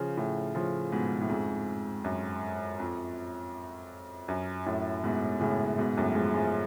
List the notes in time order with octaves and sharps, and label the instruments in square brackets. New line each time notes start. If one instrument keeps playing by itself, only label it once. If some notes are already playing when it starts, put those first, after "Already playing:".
Already playing: [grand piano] C#3 F3
A2 C#3
C#3 F3
G#2 B2
A2
F2 G#2
F#2
F2
F#2
F#2 A2
G#2 B2
A2 C#3
G#2 B2
F#2 A2
F3 G#3
F3 G#3